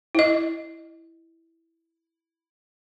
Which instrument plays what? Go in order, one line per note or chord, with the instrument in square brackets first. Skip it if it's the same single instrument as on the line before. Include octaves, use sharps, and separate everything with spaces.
[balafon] E4 D#5